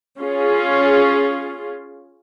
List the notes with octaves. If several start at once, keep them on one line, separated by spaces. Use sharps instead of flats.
C#4 F4 G#4